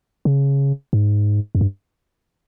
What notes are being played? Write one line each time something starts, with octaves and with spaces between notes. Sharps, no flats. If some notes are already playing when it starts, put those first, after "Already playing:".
C#3
G#2
F#2
G2